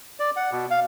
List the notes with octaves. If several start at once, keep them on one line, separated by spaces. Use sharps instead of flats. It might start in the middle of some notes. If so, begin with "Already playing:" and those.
D5
F#5
B2
F5